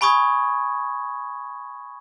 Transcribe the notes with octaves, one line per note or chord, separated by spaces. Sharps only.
G#5 B5 C#6 D#6 G#6